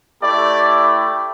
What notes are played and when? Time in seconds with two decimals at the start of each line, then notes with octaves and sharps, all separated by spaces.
0.22 A3 E4 G4 D5
0.64 D5